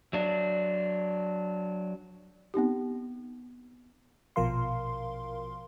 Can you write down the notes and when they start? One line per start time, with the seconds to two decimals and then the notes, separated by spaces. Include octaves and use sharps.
0.13 F#3 D4
2.54 B3 C4 D#4 G4
4.36 A#1 B2 F3 A#4 F5 C6